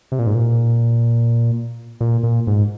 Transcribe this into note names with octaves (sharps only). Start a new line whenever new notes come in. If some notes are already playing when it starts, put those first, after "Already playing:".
C3
A#2
G#2
A#2
A#2
A#2
G#2